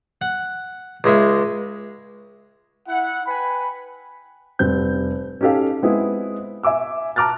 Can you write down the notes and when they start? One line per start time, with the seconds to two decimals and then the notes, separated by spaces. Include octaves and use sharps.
0.21 F#5
1.04 C#2 G#3 E5
2.87 E4 F#5
3.26 B4 G5 G#5 B5
4.59 F1 G3 C4 G6
5.41 C#4 D#4 G4 A4 F5
5.83 G#3 B3 C4 E4 G#4
6.63 E5 G#5 D6 E6
7.16 A5 A#5 D6 F6 F#6 A6